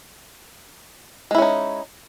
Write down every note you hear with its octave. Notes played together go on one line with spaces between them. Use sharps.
G#3 C#4 D#4 E4